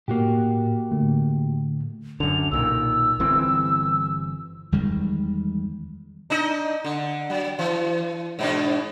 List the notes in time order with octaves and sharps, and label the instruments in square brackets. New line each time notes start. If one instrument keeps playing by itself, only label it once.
[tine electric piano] A2 [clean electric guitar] A#3 F#4 G4
[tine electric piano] A2 D3 A3
[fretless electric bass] F#2 D3 [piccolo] F7
[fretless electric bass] B1 A#2 D#3 [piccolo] E6
[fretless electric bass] G1 E3 C4
[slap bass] E2 D#3 G3 G#3
[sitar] D4 D#4 D#5
D3
F#3
E3
G#2 B2 D4